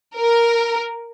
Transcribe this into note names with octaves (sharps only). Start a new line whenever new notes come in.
A#4